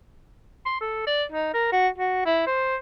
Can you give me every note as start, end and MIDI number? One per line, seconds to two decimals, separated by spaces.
0.66 0.80 84
0.81 1.05 69
1.07 1.24 74
1.32 1.51 63
1.54 1.67 70
1.72 1.88 66
1.98 2.25 66
2.26 2.44 64
2.47 2.76 72